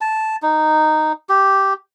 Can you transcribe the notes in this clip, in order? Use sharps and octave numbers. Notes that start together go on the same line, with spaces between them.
A5
D#4
G4